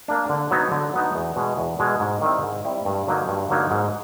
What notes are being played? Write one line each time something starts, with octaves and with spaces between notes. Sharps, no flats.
A#3 D4
D3
F#3 B3 D#4
D3
F#3 B3 D#4
E2
B2 G#3
E2
B2 G#3
G#2
D#3 G3 C4 E4
G#2
D#3 G3 C4 E4
G2
D3 F#3 A#3 D#4
G2
D3 F#3 A#3 D#4
G#2